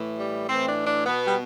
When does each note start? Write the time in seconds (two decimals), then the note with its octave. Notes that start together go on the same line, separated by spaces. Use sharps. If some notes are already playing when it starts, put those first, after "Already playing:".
Already playing: A2 E3
0.19 G3
0.48 A2 E3 C4
0.67 D4
0.87 D4
1.06 B2 B3
1.27 G3